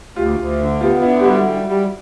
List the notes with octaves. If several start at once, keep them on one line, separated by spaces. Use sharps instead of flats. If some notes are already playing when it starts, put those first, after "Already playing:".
D2 F4 G4
D2
D3
B3 F4 G4
F4
D3 E4
G4
G3 E4 F#4
G3
G3